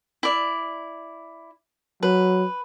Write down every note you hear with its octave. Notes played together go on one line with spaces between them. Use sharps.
E4 D5
F#3 B4